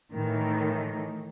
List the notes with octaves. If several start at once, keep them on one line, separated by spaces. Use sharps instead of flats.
A2 D#3 E3